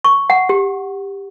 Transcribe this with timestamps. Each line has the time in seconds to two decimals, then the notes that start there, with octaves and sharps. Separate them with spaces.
0.04 C#6
0.30 F#5
0.49 G4